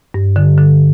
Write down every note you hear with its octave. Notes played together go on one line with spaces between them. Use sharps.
G2
D3
D3